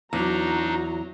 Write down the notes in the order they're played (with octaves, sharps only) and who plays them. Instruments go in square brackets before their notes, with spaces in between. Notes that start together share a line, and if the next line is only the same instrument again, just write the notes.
[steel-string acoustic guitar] E2 [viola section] F#3 A#5 [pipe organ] D4 D#4